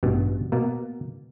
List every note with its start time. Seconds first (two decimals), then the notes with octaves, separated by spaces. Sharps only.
0.03 A1 G2 B2
0.52 B2 A#3